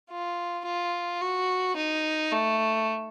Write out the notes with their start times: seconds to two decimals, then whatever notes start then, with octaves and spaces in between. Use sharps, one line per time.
0.10 F4
0.65 F4
1.21 F#4
1.76 D#4
2.32 A3